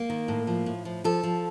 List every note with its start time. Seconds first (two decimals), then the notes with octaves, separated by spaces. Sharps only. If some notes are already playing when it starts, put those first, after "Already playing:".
Already playing: A#3
0.10 D#3
0.28 A2
0.47 F3
0.66 A2
0.85 F3
1.04 F3 A4
1.23 F3